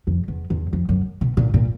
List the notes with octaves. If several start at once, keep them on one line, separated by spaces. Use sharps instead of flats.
F2
E2
E2
F2
F#2
B2
A#2
A#2